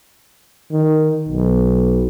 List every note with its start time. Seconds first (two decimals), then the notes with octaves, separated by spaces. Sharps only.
0.71 D#3
1.28 B1